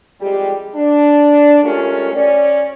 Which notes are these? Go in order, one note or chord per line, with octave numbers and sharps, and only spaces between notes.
F2 G3 G#3 G4
D4
G#3 A3 C#4 F4 G4 A#4
C#4 D5